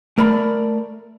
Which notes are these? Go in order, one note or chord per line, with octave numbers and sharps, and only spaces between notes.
A3 A#4 D5 B5